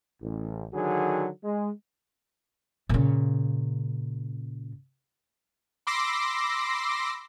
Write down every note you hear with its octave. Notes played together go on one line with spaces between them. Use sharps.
A1
D3 D#3 F#3 F#4 G#4
G#3
A#2 C#3
B5 C6 D6 E6 A#6 C7